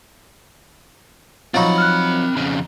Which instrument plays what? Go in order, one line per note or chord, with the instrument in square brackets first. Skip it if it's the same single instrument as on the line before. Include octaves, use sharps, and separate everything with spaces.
[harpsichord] F3 F#3 D#4 [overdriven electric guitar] C4 B5 [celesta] C#6 A6
[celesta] F6 F#6
[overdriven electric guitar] F2 C#3